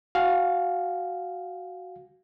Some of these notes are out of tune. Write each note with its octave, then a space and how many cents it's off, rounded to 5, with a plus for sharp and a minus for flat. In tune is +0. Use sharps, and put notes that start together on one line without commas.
F#4 +0 F5 +0 G#5 +0